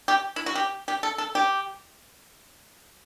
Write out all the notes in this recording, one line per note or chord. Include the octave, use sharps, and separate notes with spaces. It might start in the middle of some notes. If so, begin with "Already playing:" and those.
G4
E4
F#4
G4
G4
A4
A4
G4